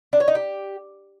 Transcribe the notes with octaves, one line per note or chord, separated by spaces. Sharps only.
D4
C#5
D#4
G4